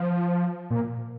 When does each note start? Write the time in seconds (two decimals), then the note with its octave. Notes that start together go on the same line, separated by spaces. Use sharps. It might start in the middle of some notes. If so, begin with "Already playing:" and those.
Already playing: F3
0.70 A#2